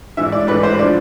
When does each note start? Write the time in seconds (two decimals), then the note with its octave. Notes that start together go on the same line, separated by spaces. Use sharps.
0.17 A1 G#2 E3 E5
0.32 D5
0.47 A1 G#2 E3 B4
0.63 C5
0.79 D3 F3 D5